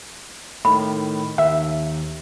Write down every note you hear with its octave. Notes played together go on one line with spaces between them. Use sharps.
A2 D#3 B5
D#2 E5